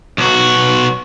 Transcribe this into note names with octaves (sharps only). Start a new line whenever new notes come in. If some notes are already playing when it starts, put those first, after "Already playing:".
B1 F#4